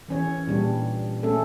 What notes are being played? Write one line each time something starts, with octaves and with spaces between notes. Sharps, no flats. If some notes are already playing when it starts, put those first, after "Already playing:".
E3 C#4 C#5
A#2 G3 D4
A3 C#4 A4